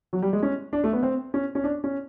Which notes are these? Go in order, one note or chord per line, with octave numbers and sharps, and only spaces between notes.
F#3
G3
G#3
C#4
D4
A3
B3
C4
C#4
C#4
D4
C#4